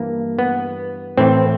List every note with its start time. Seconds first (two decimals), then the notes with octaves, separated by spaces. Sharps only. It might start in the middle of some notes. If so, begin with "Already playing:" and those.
Already playing: G2 E3 A#3
0.39 B3
1.18 A2 E3 C4